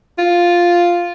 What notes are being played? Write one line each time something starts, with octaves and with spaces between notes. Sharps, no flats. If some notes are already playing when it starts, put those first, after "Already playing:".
F4